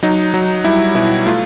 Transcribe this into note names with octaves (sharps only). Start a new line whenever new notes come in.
F#3 D#4
F#3
G3 E4
B2 E4
A3 F4